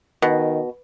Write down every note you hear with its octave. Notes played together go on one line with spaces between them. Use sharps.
B2 D#3